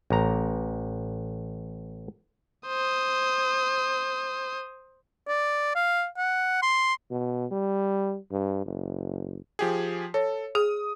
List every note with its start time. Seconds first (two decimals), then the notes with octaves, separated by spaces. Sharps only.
0.10 A1 A#5
2.67 C5 D#6
5.28 D5
5.75 F5
6.18 F#5
6.63 C6
7.10 B2
7.51 G3
8.31 G2
8.66 F#1
9.59 F3 G4 G#4
10.14 A4 C#5
10.55 G#4 D#6